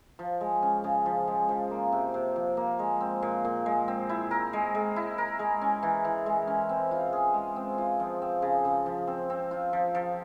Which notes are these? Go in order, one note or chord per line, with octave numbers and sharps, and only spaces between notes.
F3
G#3
C#4
C#3
F3
G#3
F3
A#3
C3
C3
F3
A#3
G#3
C4
A#2
A#2
G#3
C4
E4
A#4
G#3
G#3
E4
A#4
G#3
C#4
E3
E3
G#3
C#4
C4
F4
G#4
G#3
C4
F4
F3
C4
C#3
C#3
F3
C4
C4
F4
F3
F3